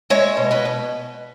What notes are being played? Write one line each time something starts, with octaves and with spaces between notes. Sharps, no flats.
G#3 C#5 E5
B2
B4 D#5
B2